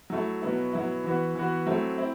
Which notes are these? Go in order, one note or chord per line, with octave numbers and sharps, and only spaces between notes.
F#3 A3 E4
B2 F#3 B3 E4
B2 F#3 B3 E4
E3 B3 F#4
E3 B3 F#4
F#3 A3 C4 E4
C4 E4